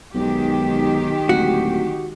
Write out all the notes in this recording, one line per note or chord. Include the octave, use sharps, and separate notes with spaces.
B1 D#3 G#3 G4
D1 F#4